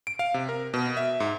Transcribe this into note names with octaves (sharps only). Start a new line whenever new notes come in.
D7
F5
C3
A#4
B2
E5
G#2